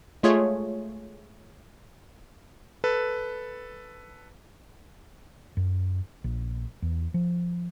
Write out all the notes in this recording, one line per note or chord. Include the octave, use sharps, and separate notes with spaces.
G#3 A3 F4 G#4 C#5
A4 B4
F#2
A#1
E2
F3